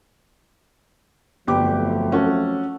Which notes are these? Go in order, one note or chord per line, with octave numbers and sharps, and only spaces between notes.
G1 F2 F#3 A3 G4 D6
C#4 F#4 A4